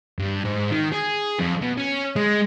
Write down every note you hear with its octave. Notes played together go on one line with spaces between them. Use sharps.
G2
G#2
D#3
G#4
F2
B2
C#4
G#3